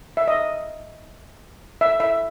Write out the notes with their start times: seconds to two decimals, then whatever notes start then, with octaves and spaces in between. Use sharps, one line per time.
0.17 E5
0.28 D#5
1.81 E5
2.00 E5